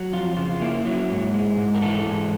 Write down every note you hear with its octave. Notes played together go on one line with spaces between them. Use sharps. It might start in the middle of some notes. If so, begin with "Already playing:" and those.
Already playing: F#3
F2 F4
C#3 F4
A#3 E4
F#3 E4
G#2
G#3
G#2
A#4
E3 A4
G#2